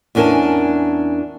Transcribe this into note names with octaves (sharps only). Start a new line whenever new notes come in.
E2 C#4 D4 A#4 G#5 A5